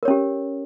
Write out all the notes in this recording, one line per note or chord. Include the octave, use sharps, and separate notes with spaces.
C#4 G4 A#4 C#5